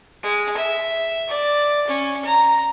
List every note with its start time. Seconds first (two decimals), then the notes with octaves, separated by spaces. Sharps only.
0.23 G#3
0.57 E5
1.29 D5
1.88 C#4
2.25 A#5